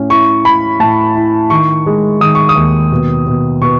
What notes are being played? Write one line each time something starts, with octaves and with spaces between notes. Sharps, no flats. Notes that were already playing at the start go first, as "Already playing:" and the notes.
Already playing: A2 C#4
E4 C#6
E4 B5
A2 A5
E4
D#3 C#6
G#3
D#3 D#6
C#6
D#6
D#2
B2
B2
B2 C#6